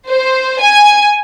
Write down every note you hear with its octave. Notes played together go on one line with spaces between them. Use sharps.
C5
G#5